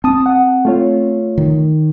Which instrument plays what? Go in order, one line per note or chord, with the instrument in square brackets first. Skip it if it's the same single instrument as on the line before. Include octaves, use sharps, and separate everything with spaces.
[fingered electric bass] C4 [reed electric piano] A5 D#6
[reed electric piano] F#5
A3 F4 C#5
[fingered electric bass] D#3